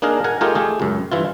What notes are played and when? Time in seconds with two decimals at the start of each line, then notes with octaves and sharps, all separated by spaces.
0.02 A#3 D4 D#4 G#4 A#4
0.24 A#4 F#5 G#5
0.41 A3 D#4 F4 G4 G#4 A#4
0.55 A3 G4 G#4
0.80 C#2 F#2
1.12 G2 E3 E4 F4